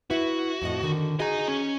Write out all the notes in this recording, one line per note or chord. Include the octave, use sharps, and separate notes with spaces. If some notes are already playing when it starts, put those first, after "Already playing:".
E4 F#4 B4
F2 A2 D#5
D3 D#3
F#4 G#4 D#5 A#5
C#4